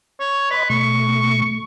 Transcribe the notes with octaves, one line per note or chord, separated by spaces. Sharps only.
C#5
B4 D#5 C6
B2 A3 C#6